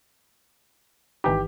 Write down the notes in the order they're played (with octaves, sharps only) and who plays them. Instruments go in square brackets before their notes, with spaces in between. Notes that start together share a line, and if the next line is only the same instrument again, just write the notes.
[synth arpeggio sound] G#1 E3 D#4 [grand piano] G4